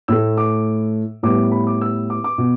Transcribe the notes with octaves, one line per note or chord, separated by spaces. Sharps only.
A2 A3 E6
D6
A2 G3 B3 D6
B5
D6
E6
D6
D6
B2 B3